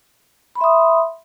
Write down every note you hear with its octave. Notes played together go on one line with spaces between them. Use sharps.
E5 B5 C6 D#6